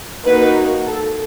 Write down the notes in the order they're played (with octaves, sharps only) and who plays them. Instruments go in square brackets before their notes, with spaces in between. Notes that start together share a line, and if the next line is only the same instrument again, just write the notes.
[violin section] A#3 D#4 F#4 B4
A4